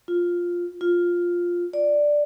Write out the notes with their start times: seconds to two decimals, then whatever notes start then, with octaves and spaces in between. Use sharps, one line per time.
0.08 F4
0.81 F4
1.73 D5